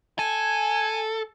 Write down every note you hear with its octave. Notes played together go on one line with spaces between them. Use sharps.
A4 G#5